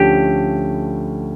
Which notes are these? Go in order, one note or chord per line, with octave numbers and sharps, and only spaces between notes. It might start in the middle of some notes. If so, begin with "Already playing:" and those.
Already playing: D2 D3 F3 A3 C#4 G4